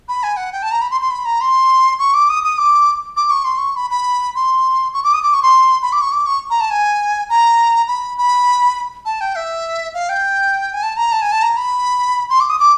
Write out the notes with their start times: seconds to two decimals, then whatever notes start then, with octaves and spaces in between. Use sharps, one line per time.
0.09 B5
0.23 G#5
0.37 F#5
0.53 G5
0.63 A5
0.71 A#5
0.81 B5
0.91 C6
1.01 C6
1.11 B5
1.25 A#5
1.41 C6
1.99 C#6
2.14 D6
2.29 D#6
2.44 D#6
2.58 D6
3.17 D6
3.31 C#6
3.45 C6
3.58 C#6
3.76 B5
3.90 B5
4.35 C6
4.94 C#6
5.04 D6
5.14 D#6
5.23 D6
5.34 C#6
5.43 C6
5.82 B5
5.93 D6
6.01 C#6
6.12 D6
6.26 C#6
6.50 A#5
6.60 A5
6.71 G#5
7.29 A#5
7.88 B5
8.18 B5
9.05 A5
9.21 G5
9.36 E5
9.94 F5
10.09 G5
10.73 G#5
10.83 A5
10.97 A#5
11.12 A5
11.22 G#5
11.32 A5
11.42 A#5
11.57 B5
12.30 C6
12.40 D6
12.49 D#6
12.59 D6